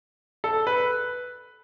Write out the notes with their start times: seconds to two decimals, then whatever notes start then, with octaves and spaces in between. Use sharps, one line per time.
0.44 A4
0.67 B4